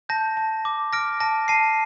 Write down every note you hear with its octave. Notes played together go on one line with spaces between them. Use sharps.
A5 G6 A#6
A5
D6
F6 A#6 D7
A5 A#6 D7
A5 C7 D#7